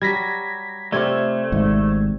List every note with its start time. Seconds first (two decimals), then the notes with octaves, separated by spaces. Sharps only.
0.02 F#3 G3 G#6 A#6 B6
0.92 C3 A3 C4 F4 D5 G#6
1.52 G#1 G#2